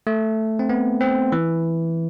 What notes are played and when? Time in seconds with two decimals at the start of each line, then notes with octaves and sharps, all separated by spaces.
0.07 A3
0.59 C4
0.69 B3
1.00 C4
1.32 E3